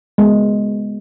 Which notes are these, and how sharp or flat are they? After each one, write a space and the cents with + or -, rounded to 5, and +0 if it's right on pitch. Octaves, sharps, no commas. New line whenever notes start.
G#3 +0 B3 +0